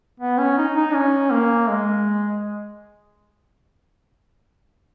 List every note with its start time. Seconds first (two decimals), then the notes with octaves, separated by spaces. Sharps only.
0.20 B3
0.38 C#4
0.58 D#4
0.76 D#4
0.94 C#4
1.32 A#3
1.70 G#3